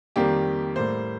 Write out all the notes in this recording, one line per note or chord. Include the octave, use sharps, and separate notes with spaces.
F2 D#3 G3 A#3 G4
A2 G3 A#3 C5